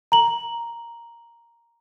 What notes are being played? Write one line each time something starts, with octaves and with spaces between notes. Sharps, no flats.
A#5 F#7